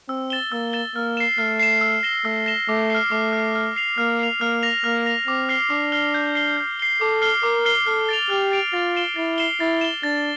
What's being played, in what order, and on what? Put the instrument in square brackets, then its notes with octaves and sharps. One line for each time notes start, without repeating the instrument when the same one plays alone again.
[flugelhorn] C4 [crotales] E6
[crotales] A6 E7 G7
[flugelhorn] A#3 [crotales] E6
[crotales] A6 E7 G7
[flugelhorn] A#3 [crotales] F6
[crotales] C7 E7
[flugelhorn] A3 [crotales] F6
[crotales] C7 E7
E6
A#6 E7 G7
[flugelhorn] A3 [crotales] E6
[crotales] A#6 E7 G7
[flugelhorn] A3 [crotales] D6
[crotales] F6 C7
[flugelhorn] A3 [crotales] D6
[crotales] F6 C7
F6
C7 F7
[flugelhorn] A#3 [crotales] F6
[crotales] C7 F7
[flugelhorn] A#3 [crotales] F6
[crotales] A#6 F7
[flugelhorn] A#3 [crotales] F6
[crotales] A#6 F7
[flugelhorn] C4 [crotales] D6
[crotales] F6 C7 G7
[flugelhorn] D4 [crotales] D6
[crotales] F6 C7 G7
G6
C7 G7
G6
C7 G7
[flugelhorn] A4 [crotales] D6
[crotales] F6 C7 G7
[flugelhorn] A#4 [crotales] D6
[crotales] F6 C7 G7
[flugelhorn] A4 [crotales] F6
[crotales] A6 D7 F7
[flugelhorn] G4 [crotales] F6
[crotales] A6 D7 F7
[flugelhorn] F4 [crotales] A6
[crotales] C7 E7 G7
[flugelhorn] E4 [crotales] A6
[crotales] C7 E7 G7
[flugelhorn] E4 [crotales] A6
[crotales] E7 G7
[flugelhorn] D4 [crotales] A6